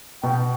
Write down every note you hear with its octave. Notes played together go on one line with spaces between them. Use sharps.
B2 G5